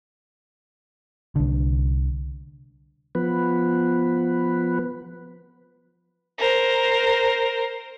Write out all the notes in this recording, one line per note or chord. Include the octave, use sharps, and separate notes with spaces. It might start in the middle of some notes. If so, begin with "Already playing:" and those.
C2 D3
F3 B3 B4
A#4 C5